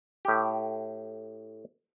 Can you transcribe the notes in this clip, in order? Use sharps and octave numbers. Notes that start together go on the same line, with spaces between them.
A2 G4